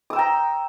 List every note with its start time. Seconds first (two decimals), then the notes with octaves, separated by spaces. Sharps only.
0.10 D#6
0.13 E6
0.16 G5
0.19 A#5